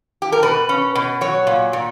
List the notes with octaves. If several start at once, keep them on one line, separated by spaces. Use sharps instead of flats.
G4
A#4
B2 B4
C#4
B2
F#3 C#5
A#2
A#2